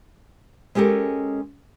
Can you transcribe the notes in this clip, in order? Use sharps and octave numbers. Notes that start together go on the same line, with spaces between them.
G#3 C#4 G4 A4 A#4